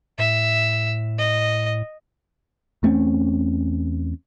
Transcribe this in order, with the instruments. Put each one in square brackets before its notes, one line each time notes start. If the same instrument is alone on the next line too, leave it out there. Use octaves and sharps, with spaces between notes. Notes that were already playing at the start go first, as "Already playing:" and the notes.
[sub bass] A2 [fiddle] E5
[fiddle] D#5
[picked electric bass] E2 A3 C4 C#4